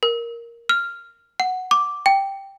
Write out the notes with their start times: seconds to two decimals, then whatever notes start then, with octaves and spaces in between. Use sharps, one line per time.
0.03 A#4
0.69 F6
1.40 F#5
1.71 D6
2.06 G5